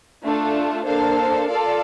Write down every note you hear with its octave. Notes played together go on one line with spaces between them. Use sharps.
A3 D4 F4 A4
A#3 D4 A4 C5 F5
F4 A4 D5 F5